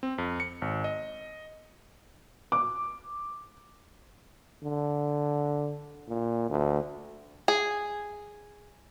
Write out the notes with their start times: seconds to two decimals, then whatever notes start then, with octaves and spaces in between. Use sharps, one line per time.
0.03 C4
0.18 F2
0.40 C#7
0.62 G#1
0.84 D#5
2.52 D6
4.63 D3
6.08 A#2
6.50 D2
7.48 G#4